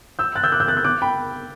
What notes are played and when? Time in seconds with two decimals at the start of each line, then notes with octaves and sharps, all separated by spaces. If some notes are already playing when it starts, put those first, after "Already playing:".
0.19 E6 G6
0.35 F#6 A6
0.44 E6 G6
0.52 D6 F#6
0.60 E6 G6
0.68 F#6 A6
0.77 E6 G6
0.85 D6 F#6
1.02 G5 B5